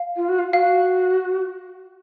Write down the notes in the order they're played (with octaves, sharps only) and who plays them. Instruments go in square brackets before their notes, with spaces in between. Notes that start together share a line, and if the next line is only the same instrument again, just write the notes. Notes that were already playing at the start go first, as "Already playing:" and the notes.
Already playing: [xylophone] F5
[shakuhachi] F4
F#4
F4
[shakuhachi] F#4 [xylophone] F5